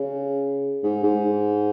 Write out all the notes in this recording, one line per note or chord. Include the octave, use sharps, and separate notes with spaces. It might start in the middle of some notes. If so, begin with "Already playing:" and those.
Already playing: C#3
G#2
G#2